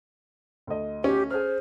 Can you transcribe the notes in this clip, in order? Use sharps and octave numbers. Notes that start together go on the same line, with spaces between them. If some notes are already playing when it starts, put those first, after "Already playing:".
D2 D#5
C#4 G4
G#4 C5 F6